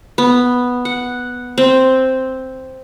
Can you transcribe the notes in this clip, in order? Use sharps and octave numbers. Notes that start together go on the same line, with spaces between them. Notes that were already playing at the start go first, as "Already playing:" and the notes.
B3
F#5
C4